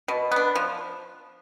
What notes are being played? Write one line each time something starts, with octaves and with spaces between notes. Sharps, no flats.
B2
B3 D4
F3